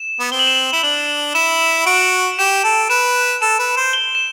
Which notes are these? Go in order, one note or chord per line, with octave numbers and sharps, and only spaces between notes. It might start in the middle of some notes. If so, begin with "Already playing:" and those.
Already playing: E7
B3
C4 G7
F#7
E7
F#7
E4 E7
D4 F#7
E4 E7
F#4 D7
G4 E7
A4
B4 E7
A4 E7
B4
C5
G7
E7